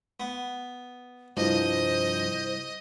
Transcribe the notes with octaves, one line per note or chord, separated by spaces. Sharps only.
B3
C2 G2 F3 C5 D#5